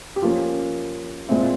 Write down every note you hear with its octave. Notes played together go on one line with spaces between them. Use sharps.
G4
F3 A#3 C#4 F4
A#2 G#3 C4 E4
F4